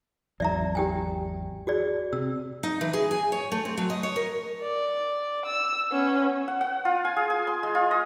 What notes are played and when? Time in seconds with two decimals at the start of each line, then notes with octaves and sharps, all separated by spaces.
0.40 G#1 E2 F#3 D5 E5 A#5
0.75 G4 G5 G#5
1.67 F#4 G#4 D5
2.13 C3 E6
2.63 D#4
2.81 E3
2.93 G#4
3.11 G#5
3.32 C#5
3.52 A3
3.65 C4
3.77 F#3
3.90 D#5
4.03 C#5
4.16 A#4
4.62 D5
5.46 E6
5.92 B3 C#4
6.48 F#5
6.61 F#5
6.85 F4
7.05 G#5
7.16 G#4
7.30 G#5
7.47 C6
7.63 G#3
7.75 F4
7.91 D#5